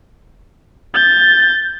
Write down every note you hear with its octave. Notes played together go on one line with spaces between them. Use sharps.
G6 A6